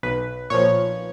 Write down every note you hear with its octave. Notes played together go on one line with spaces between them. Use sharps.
B1 B4
A#2 F3 C#5